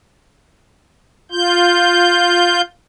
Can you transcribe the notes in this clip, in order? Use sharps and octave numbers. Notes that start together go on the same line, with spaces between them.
F4 G6